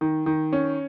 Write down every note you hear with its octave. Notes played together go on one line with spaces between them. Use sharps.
D#3
D#3
C#4